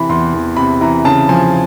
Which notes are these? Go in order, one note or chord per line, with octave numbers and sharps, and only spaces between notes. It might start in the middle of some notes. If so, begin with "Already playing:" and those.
Already playing: C3 E3 B5
E2 C6
E2
C3 B5
E3 A#5
C#3 A5
F3 G#5